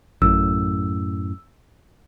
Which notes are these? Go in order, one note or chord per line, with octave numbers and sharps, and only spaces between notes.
A1 F#2 A2 E6